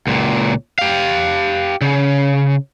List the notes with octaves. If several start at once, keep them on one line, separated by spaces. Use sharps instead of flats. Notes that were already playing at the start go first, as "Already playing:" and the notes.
C#2 A#2
G4 F5
C#3